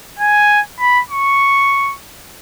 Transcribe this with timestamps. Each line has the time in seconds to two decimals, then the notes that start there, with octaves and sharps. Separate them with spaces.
0.19 G#5
0.80 B5
1.10 C#6